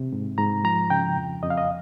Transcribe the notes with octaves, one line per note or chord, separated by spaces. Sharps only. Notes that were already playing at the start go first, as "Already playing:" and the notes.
Already playing: C3
G#2
G#2 A#5
F3 A#5
C#3 G5
F2
F2 D#5
F5
D#5